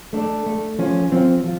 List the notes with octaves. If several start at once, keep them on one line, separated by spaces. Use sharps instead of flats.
A3 D4
A3
F3 C#4
F3 C4
F3